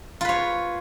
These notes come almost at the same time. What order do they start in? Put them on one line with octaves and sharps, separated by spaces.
F4 B4 C#5